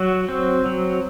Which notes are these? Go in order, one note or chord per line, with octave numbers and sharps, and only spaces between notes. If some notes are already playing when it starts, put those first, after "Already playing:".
Already playing: F#3 F#4
C4
F#3